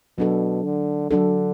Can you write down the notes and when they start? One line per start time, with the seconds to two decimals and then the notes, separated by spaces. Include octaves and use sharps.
0.18 B2 F#3 D4 A4
0.64 D3
1.10 D3 F#3 D4 A4